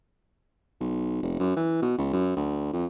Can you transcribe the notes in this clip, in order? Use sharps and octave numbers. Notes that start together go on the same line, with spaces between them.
B1
F1
F#2
E3
B2
C#2
F#2
D2
F2